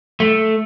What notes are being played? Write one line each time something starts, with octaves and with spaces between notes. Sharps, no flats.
A3